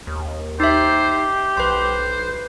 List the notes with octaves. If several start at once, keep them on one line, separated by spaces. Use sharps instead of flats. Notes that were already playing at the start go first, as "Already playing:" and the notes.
D#2
D#4 G4 C5 E5
B1 B4 C5 C6